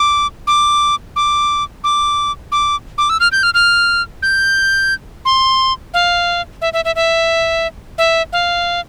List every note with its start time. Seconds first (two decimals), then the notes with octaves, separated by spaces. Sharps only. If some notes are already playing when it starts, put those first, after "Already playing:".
Already playing: D6
0.47 D6
1.16 D6
1.84 D6
2.52 D6
2.98 D6
3.10 E6
3.20 F6
3.32 G6
3.43 F6
3.54 F6
4.22 G6
5.25 C6
5.94 F5
6.62 E5
6.73 E5
6.85 E5
6.96 E5
7.98 E5
8.33 F5